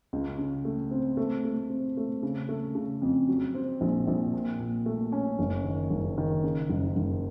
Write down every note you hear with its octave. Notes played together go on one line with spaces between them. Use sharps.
C#2
C#3
A3
C4
A3
A3
C4
A3
C#3
A3
C#3
F2
F#3
C4
A#1
A#1
A#2
A#2
A3
C#4
F#1
D#3
F#1
D#3
C#3
F#1
F#1